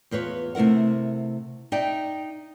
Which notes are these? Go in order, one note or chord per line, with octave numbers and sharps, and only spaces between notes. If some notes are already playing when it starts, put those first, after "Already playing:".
E2 F4 B4 C#5
C3 A3 E4 A#4 F#5
D#4 D5 E5 G5